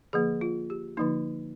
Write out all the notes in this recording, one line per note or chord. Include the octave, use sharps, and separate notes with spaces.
D3 F3 A#3 G#4
F4
G4
D3 F3 A#3 D#4